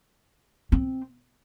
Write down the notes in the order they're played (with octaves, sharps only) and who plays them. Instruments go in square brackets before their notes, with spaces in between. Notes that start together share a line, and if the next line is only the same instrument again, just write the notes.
[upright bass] C4